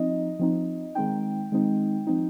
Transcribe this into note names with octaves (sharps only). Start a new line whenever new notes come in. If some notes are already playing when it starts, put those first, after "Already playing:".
Already playing: F3 C4 D#4 D#5
F3 C4 D#4
D#3 G#3 C4 D#4 G5
D#3 G#3 C4 D#4
F3 C4 D#4